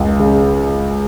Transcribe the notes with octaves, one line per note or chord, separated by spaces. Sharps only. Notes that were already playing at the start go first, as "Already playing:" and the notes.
Already playing: C#2
C#3